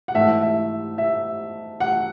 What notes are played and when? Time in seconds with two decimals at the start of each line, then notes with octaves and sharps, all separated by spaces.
0.08 F#5
0.15 G#2 E3 A3 E5
0.42 E5
0.98 E5
1.80 F#5